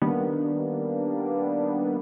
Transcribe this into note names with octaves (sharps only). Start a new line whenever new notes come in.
D#3 G3 A#3 B3 D4